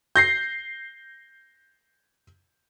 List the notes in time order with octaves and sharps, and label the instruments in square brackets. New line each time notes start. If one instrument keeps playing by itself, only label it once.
[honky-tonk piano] G6 A#6 C7